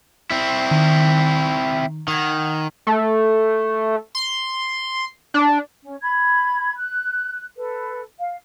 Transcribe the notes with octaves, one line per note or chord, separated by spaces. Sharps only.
C4 E4
D#3
D#3 F#5 G#6
A3
C6
D4
C#4
B5 G#6
F#6
A4 B4
F5